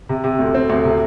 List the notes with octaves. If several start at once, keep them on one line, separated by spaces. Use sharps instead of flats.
C3
C3
D2
C4
D2
C3